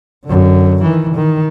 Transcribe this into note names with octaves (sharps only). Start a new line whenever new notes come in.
F#2 D3
D#3 E3
D#3